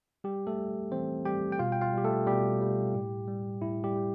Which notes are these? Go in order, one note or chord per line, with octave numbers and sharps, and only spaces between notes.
G3 G4
A3 A4
G3
E3 C4 C5
G3 G4 G5
G5
B2 F4 F5
G5
F4 F5
G3 G4
A3 A4
B2 G3 G4
G3
A2
G3
A2 E4
G3 G4
G3